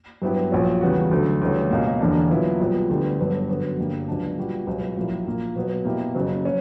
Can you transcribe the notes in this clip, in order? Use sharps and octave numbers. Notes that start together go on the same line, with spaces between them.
G2 F#3 B3 E4 G4
A#1 A#2 F#3 C#4
E2 C#3 G3 B3 F#4
D2 D3 F#3
D2 C#3 E3 G3 C#4
C#2 B2 A#3
E1 E2 D3 A#3 D4
A#2 F#3 B3 E4
B1 A#2 G3 B3
D2 D3 G3 B3
G1 G2 F#3 B3
F#2 D3 F#3 B3 F#4
G1 G2 D3 G3 A#3
C#2 C#3 F#3 B3 D4
A#2 G3 B3 F#4
C#2 B2 F#3 B3
A#1 A#2 F#3 A#3 E4
A#1 A#2 A#3
B2 F#3 B3 F#4
B2 A#3 E4 G4
F#1 F#2 C#3 F#3
F#3 C#4